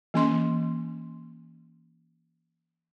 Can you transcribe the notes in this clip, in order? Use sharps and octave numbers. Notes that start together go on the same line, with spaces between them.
E3 A#3 C#4 C6